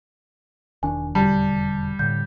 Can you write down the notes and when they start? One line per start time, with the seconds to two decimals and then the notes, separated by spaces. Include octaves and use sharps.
0.83 E1 D#3 D4 G#5
1.15 E1 F2 D3 G3 A5
1.99 A2 D3 G6